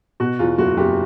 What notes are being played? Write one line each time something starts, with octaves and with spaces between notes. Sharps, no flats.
B2 F#4
E2 F4
F#1 F#4
F#1 G4